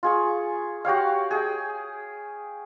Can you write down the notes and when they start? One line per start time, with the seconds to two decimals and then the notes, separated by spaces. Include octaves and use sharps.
0.03 F4 G#4 C#6
0.85 F#4 G4 C#5 F5
1.31 G#4 G5